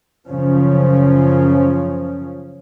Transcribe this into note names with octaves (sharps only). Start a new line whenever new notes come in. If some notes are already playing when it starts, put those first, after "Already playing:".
F#2 C#3 F3 C#4